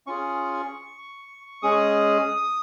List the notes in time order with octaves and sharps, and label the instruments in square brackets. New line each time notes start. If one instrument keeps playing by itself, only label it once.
[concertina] C#4 F4 G#4 C#6
G#3 C#4 G#4 D#6